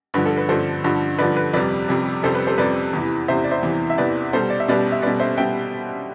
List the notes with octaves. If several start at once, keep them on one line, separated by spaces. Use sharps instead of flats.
G2 D3 F3 B4
A4
B4
G2 D3 F3 A4 C5
G2 D3 F3
G2 D3 F3 B4 D5
B4
F2 C3 G3 B4 D5
F2 C3 G3
F2 C3 G3 A4 C5
B4
A4 C5
F2 C3 G3 B4 D5
E2 C3 E3
E2 C3 E3 C5 E5
D5
C5 E5
E2 C3 E3
E5
E2 C3 E3 B4 D5
B2 G3 A4 C5
D5
E5
B2 G3 B4 D5
E5
B2 G3 B4 D5
C5 E5
B2 G3 E5 G5